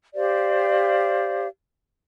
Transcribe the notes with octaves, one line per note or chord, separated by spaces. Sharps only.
G4 C5 D5 F5